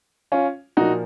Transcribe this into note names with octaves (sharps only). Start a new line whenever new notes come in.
C#4 F4
A#2 F3 A#3 D#4 F#4